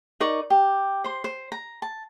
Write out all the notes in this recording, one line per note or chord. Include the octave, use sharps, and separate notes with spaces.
D#4 A#4 D5 C#6
G4
C5 C6
C5
A#5
A5